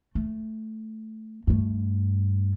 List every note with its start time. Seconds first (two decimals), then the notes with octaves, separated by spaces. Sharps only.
0.15 A3
1.47 G2 A3